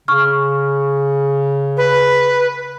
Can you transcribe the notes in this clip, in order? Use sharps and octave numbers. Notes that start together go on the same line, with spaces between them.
C#3 C#6 F6
B4